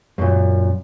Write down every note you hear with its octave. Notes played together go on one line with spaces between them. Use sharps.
F#2 A#2